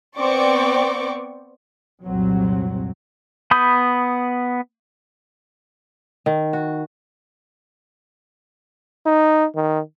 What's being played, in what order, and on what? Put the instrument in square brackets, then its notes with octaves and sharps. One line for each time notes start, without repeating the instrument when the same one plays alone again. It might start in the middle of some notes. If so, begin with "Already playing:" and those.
[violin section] B3 C4 D5 G5 C#6 D6
[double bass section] C2 F2 A#2 F#3 C4
[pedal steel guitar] B3 B5 D#6 G6
[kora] D#3
F#4
[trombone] D#4
D#3